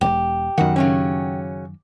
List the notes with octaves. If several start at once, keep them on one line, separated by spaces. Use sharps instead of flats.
E1 G4
F#2 B2 D#3 F#5
C#3 F#3 C#4